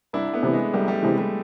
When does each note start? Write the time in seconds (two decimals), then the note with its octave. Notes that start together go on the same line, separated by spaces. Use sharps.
0.13 C2 D4 E4
0.33 A3 B3
0.43 C3 E3
0.53 G#3
0.74 C2 G3 A3
0.88 G3 A3
1.02 C3 E3 G#3
1.18 G3 A3